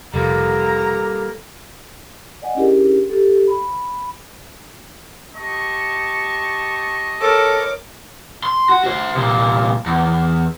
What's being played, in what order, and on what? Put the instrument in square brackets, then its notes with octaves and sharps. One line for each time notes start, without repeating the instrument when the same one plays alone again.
[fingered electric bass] F1 [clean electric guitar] G3 A#3 [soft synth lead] A4 [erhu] A#5
[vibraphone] D5 D#5 F#5 G#5
C#4 D4 E4 G4 G#4 A#4
G4 A4
B5
[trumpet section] G4 A5 C#6 [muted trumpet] D#5
[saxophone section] A4 [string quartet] A#4 C#5 D6
[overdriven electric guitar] C6
F#4
F#4 C5
C2 A#2
E2